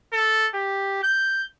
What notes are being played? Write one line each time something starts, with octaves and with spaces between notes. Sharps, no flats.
A4
G4
G6